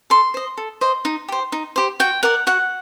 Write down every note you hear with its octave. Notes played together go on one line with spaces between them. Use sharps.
A4 C6
C5 D#5
A4
C5 D#5
D#4
G4 C5
D#4
G4 C5
F#4 G5
A#4 D5 F#5
F#4 F#5